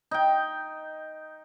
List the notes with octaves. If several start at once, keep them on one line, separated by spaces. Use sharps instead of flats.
D#4 G5